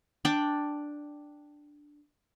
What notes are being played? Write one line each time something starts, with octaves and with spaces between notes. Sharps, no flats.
D4 D5 G5